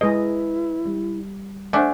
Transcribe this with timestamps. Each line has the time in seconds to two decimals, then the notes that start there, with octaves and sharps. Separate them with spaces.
0.01 G#3 E4 G#4 B4 D#5
0.85 G3
1.73 A3 D4 C5 F#5 G#5